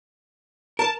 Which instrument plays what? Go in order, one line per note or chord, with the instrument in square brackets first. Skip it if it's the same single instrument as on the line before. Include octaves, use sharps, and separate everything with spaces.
[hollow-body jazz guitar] A#4 [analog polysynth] A5